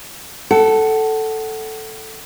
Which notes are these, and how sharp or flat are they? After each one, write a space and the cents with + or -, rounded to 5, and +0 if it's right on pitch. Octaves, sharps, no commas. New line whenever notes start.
A4 +0 F#5 +25